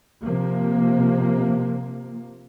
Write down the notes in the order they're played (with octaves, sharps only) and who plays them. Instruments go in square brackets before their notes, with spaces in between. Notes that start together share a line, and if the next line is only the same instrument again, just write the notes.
[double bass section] C3 F3 A#3